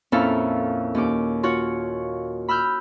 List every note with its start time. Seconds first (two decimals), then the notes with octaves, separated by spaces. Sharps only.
0.12 F2 A#2 C#4 E4 A4 F5
0.95 D#2 C#4 D6
1.43 F4 F#4 C#5
2.48 B5 E6 F6 G6